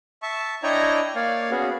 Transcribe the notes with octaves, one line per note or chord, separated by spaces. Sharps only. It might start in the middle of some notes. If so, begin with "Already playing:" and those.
E5 A5 C#6
D4 E4 C#5 D#5 G5 A#5
A#3 C#5 D5 F5
B3 C#4 F#4 G#4